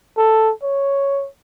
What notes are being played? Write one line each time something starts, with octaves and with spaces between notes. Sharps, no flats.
A4
C#5